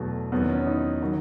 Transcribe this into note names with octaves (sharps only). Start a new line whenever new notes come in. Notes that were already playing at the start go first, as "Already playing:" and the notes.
Already playing: E2 B2 F#3 A3
E2 D#3 F#3 B3
C#4
D#4
D#3 F#3